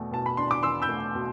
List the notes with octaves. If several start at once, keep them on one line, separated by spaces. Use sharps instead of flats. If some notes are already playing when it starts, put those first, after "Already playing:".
Already playing: E2 B2 A3
B2 A5
B5
D4 C6
D6
E2 C6 E6
E6 G6
A3
B2